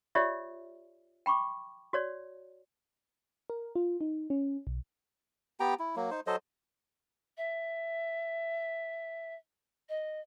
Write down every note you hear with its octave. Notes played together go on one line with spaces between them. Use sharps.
F4 G4 C#5 D5 E5
G5 B5 C#6 D6
F#4 C#5 D5
A#4
F4
D#4
C#4
B1
B3 G4 G5 A#5
E4
F#3 A#3
D#4 C5
F#3 A4 C5 D#5
E5
D#5